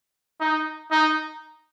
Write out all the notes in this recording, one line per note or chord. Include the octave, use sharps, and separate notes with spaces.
D#4
D#4